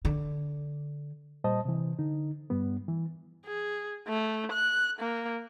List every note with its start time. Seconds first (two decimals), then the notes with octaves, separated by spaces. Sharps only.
0.05 D3
1.44 A#2 G3 C5 D#5 A5 D#6
1.65 C3 E3
1.99 D3 D#4
2.50 G2 G3 B3
2.88 E3
3.46 G#4
4.08 A3
4.52 F#6
4.99 A#3